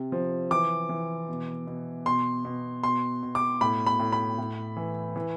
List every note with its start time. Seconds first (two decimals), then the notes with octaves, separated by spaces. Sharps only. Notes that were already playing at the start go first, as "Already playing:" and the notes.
Already playing: C3
0.12 F3
0.51 E3 D6
0.89 E3
1.29 B2
1.67 B2
2.06 B2 C6
2.45 B2
2.83 B2 C6
3.23 B2
3.35 D6
3.61 A2 B5
3.87 B5
3.99 A2
4.12 B5
4.38 A2
4.77 E3
5.16 E3